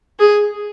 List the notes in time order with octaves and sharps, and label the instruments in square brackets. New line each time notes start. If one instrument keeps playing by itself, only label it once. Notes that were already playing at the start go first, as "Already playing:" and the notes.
[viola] G#4